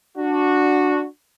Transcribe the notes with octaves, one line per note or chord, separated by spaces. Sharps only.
D4 F#4